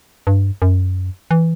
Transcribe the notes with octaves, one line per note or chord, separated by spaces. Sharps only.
G2
F#2
E3